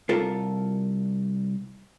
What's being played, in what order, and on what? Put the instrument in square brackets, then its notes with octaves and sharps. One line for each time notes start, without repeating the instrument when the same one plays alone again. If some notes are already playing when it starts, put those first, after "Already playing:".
[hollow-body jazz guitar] C2 F4 A4 A#4